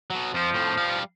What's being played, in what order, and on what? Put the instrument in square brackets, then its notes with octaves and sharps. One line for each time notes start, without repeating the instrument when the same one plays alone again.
[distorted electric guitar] B2 F#3
[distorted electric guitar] F2 C5 [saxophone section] F3
[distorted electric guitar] F2 A2
G3 F5